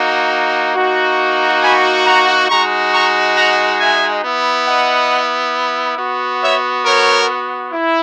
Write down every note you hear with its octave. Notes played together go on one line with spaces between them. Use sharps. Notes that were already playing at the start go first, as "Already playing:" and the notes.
Already playing: A#3 D#4 F#4
A#3 D#4 F#4
G#5 B5
F#5 A#5
G#3 D#4 F#4 A#5 C#6
A#5 C#6
F#5 A#5
E5 G#5
B3 E4
D#5 F#5
B3 F#4
C#5 E5
A#4 C#5
E4